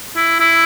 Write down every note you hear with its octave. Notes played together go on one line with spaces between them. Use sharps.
E4
E4